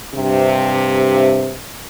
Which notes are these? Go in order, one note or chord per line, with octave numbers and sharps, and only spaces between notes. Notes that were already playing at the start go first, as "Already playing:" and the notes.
G2 C3